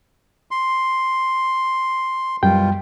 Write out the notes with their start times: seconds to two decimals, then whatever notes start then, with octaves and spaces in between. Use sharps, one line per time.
0.51 C6
2.43 F#2 B2 G3 F4 G5